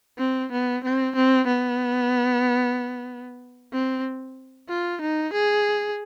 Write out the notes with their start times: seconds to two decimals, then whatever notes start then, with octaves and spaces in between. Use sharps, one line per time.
0.18 C4
0.52 B3
0.84 C4
1.16 C4
1.47 B3
3.73 C4
4.69 F4
5.02 D#4
5.33 G#4